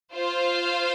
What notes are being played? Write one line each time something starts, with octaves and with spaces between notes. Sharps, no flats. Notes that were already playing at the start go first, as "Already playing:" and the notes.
F4 C5 F5